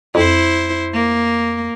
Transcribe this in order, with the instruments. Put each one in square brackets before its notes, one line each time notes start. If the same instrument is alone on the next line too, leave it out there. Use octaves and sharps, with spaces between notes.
[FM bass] F2 [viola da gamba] E4 C5
[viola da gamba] A#3